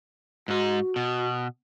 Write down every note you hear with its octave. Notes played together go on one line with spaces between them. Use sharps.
G#2 D#4 F#4
B2